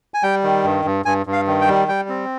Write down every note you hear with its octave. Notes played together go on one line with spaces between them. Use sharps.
G#5
G3 G5
D#3
G2
G2
G2 G#5
G2
F5
D#3
G5
G3
G3 G5
C4